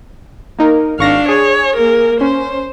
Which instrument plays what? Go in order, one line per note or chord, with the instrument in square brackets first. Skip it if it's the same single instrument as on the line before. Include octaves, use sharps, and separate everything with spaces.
[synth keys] A#3 D#4 A#4
[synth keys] G#1 C#6 A#6 [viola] D4 F5
[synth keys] G#4 [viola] C#5
[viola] A#3 A#4
[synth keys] C#4 [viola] C5